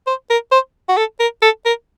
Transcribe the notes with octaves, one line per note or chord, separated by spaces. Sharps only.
C5
A#4
C5
F#4
A4
A#4
A4
A#4